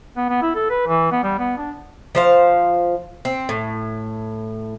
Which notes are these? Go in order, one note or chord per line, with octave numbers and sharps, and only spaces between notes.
B3
B3
E4
A4
B4
E3
B3
G3
B3
D4
F3 C5 F5
C4
A2